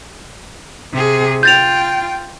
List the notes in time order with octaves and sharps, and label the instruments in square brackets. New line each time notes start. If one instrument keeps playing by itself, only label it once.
[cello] C3 G#4
[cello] F4 G5 [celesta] G6 A6 F7